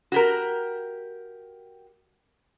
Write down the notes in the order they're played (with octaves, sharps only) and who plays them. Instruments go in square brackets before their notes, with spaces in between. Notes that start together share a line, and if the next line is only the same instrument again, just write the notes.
[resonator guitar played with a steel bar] F#4 G4 A#4